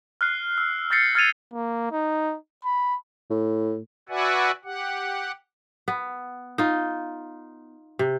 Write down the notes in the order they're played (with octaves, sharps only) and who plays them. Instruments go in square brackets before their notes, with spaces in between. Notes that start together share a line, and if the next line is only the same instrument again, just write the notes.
[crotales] F6 F#6 C7
E6
E6 G6 A6 A#6 C7 C#7
F6 G#6 A6 C#7 D#7 F7
[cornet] A#3
D#4
B5
[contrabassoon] A2
[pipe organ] F#4 B4 D5 E5 F#5 G#5
G4 F#5
[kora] B3
D#4 F4
C3